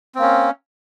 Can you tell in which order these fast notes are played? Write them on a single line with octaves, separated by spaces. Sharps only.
C4 A#3 C#4